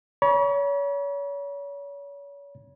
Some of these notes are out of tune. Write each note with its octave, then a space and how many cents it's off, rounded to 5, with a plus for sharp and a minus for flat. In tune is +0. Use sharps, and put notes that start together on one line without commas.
C#5 +35 B5 -40